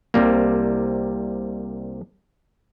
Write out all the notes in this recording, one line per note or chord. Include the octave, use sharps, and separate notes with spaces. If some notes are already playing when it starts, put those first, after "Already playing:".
C2 C3 G3 A#3